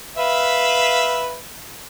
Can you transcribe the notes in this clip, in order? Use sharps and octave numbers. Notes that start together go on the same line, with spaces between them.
B4 E5 F5